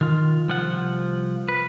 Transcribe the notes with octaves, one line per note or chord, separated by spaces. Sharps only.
D#3 F4
C2 F3 F#5
B4